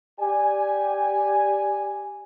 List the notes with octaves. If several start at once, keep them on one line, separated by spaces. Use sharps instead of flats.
G4 D5 G#5